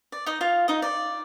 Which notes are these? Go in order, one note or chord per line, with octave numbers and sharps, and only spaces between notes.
D5
D#4 D#5
F4 F5
D#4 D#5
D5